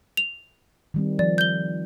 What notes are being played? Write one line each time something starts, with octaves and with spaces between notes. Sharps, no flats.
F7
D#3 G3 C4
F3 D5
G6 G7